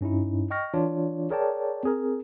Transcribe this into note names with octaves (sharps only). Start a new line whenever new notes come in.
G2 C#4 D#4 E4
D#5 G5 C#6 F6 A#6
E3 D4 F4 C#5 D5
G#4 A#4 C#5 D5 G5 A5
C4 G#4 A#4